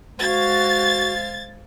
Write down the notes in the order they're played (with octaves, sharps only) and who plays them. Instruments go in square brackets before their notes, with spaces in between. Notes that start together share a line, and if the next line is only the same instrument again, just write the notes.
[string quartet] G#3 C5 F5 [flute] F#4 [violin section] G#6 A6